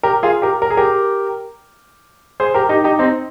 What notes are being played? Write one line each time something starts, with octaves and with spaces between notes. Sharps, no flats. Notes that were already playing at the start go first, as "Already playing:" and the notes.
G4 A#4
F4 G#4
G4 A#4
A#4
G#4
G4 A#4
G#4 C5
G4 A#4
D#4 G4
D#4 G4
C4 D#4